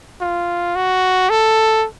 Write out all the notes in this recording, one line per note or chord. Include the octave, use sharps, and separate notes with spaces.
F4
F#4
A4